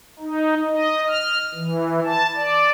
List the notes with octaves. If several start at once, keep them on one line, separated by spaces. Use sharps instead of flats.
D#4
D#5
F6
E3
A5
D5